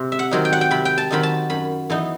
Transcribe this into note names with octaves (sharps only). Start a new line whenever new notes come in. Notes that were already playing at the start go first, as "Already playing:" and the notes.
Already playing: C3
E5
F#5
D#3 F#3 C4 D#4
G5
F#5
G5
C3 B5
G5
A5
D#3 F#3 C4 D#4 B5
A5
F#2 B5
E3 B3 D#4